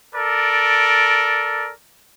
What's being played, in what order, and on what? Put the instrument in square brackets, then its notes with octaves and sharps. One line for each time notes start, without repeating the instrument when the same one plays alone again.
[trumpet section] A4 A#4 D5